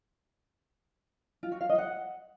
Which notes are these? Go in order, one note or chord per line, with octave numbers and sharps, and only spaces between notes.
F4
F#4
F5
D#5
F#5